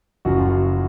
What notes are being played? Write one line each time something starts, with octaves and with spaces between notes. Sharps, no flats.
F#1 F#2 F3 F#4
F4
F#4